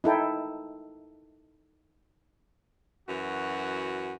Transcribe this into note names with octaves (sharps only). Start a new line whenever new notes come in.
D#4 E4 A4 G5
F#2 E3 F#4